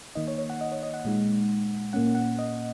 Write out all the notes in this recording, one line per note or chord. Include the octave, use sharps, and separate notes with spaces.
D#3 A#3 D#4 D#5
C#5
C#5
F#5
D#5
C#5
D#5
F#5
A#2 G#3 D#4
A#2 A#3 C#4 F#5
F#5
D#5